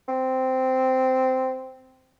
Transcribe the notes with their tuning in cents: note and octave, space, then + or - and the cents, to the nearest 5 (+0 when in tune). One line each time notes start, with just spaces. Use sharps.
C4 -10